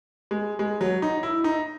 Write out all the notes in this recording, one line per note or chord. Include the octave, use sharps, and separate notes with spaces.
G#3
G#3
F#3
D#4
E4
D#4